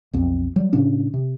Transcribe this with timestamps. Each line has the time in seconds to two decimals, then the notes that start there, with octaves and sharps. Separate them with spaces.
0.13 B1 F2
0.56 F#3 G3
0.73 A2 C#3 C#4 D4
1.14 C3